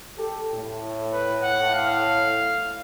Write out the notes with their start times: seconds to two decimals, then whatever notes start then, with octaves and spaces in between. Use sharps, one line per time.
0.18 G4 A4
0.53 A2
1.13 B4
1.43 F#5
1.74 F5